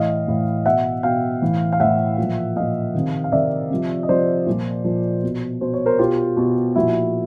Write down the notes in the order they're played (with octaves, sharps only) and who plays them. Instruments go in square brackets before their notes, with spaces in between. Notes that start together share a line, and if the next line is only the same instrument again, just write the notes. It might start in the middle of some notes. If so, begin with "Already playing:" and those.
Already playing: [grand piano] A2 E3 D#5 F5
A2 E3
B2 E5 F#5
B2 F5 G5
A2 E3
F5
A2 E3 E5 F#5
A#2
F3
A#2 F3 D#5 F5
C3 D#3
F5
C3 D#3 D5 E5
C3 F3
D#5
C3 F3 C5 D5
A#2 F3
A#2 F3
B2
B2 C5
C#5
A#4 C5
B2 F4 G4
B2
A#2 F3 E4 F#4